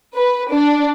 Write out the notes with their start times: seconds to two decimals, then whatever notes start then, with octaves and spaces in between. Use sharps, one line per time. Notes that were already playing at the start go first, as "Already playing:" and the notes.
0.15 B4
0.52 D4